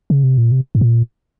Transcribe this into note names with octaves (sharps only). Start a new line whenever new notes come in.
C#3
C3
A#2
C3
G#2
A#2